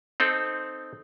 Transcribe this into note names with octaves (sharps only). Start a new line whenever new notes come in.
C4 D#4 A4